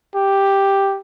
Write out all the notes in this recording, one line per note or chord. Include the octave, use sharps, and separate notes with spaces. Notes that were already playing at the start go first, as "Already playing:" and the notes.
G4